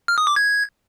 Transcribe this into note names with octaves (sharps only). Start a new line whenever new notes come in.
F6
D#6
D6
G#6